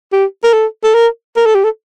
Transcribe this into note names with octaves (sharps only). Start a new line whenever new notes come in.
G4
A#4
A4
A4
A#4
A#4
A4
G4
A4